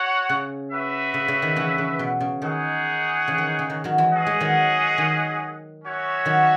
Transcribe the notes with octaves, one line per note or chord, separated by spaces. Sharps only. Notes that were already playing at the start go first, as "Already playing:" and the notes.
Already playing: F#4 C#5 F#5
C#3
F#4 B4 E5
C#3
C#3
D#3
C#3 E3
C#3
B2
C#3
D#3 D#4 G#4 C#5 F#5
C#3 E3
D#3
C#3
D#3
D#3 F#3
E3 G#3
C#4 G#4 D#5 F#5
E3 G#3
D#3 F#3
D#3
C#4 F#4 C#5 E5
D#3 F#3